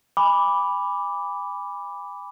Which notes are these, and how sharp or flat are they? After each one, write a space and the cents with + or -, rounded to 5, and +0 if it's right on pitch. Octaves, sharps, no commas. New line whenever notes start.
G#5 -35 B5 +0 D6 -5